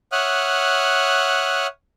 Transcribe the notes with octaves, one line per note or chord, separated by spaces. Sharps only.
C#5 E5 F#5 D#6 F6 F#6